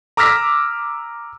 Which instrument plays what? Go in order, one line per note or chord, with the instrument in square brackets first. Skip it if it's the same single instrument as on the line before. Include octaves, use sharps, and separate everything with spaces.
[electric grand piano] A#5 D6 E6 F6 A#6 B6